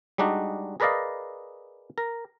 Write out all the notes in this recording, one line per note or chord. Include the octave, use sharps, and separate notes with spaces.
G3 G#3 D4 D#4 F#4
G#4 A#4 B4 D5 D#5 F5
A#4